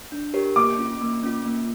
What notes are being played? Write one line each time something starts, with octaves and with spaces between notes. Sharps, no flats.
D4
G4 A#4 C#5
A#3 D6
C#4 F4
A#3
C#4 F4
A#3